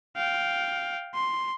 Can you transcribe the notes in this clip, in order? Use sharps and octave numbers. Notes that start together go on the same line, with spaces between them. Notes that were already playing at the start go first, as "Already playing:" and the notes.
F5 G5
C6